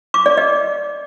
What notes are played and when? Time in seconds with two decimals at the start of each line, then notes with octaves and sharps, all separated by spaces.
0.14 D6
0.26 D5
0.37 D#5